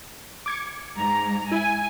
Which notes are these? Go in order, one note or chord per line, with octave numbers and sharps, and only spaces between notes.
D6 G#6 C#7
G#2 A#5
E4 G#5